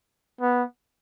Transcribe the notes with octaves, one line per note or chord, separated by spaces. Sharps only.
B3